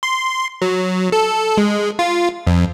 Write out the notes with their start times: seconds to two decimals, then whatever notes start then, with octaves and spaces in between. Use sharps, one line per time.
0.03 C6
0.62 F#3
1.12 A4
1.57 G#3
1.99 F4
2.47 F2